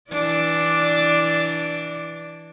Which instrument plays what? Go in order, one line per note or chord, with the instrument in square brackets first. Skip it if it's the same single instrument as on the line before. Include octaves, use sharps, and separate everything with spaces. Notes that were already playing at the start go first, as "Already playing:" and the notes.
[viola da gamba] E3 D4 D5